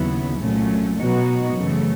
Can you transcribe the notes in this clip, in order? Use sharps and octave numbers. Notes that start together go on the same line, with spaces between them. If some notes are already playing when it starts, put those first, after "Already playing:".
Already playing: D#2 C#3 F#3 B3 E4
C2 A#2 F#3 A3 C#4
B2 F#3 B3 D#4 F#4
F#2 C#3 E3 A3